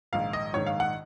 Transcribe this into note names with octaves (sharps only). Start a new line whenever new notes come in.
A#1 G#2 D#3 F5
D#5
A#1 G#2 D#3 C#5
F5
F#5